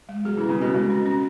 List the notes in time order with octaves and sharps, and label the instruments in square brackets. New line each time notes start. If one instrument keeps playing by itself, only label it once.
[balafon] G#3
[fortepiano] F#3 [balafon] G#4
[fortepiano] E3 [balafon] C#4
[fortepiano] C#3
[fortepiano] B2 [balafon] C#4
[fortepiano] B2 [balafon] G#3
[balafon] C#4
C#4